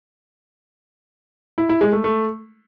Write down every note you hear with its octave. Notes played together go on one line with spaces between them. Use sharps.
E4
E4
G#3
A3
A3